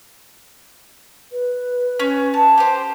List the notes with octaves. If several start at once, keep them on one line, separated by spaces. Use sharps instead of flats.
B4
C#4
A5
G4 C5